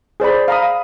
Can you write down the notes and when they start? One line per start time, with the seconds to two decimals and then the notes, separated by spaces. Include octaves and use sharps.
0.20 G#4 C5 D5 B5
0.48 F5 A#5 B5 D#6